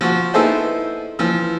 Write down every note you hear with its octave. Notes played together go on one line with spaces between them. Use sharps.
F3 F#4
B3 D#4 E4 G#4 A4 C5
E3 F3 E6